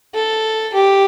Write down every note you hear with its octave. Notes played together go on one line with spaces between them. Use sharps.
A4
G4